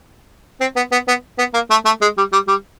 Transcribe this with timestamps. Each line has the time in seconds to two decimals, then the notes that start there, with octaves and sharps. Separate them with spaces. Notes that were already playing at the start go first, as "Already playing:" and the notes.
0.60 C4
0.76 B3
0.92 B3
1.08 B3
1.38 B3
1.54 A#3
1.70 A3
1.85 A3
2.01 G#3
2.17 G3
2.32 G3
2.48 G3